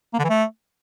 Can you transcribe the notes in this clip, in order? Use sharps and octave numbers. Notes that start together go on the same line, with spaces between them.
A#3
D3
E3
A3